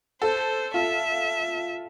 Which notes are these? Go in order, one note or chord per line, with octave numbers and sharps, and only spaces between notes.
A4 C5
F4 E5